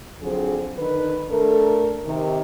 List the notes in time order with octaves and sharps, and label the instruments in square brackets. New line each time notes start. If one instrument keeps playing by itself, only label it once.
[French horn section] D3 F3 F#3 C4 G#4
D3 D#3 B4
A3 D4 A4 A#4
C3 D#3